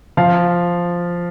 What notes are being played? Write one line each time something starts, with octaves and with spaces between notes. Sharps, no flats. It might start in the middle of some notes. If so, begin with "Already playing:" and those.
F3 F5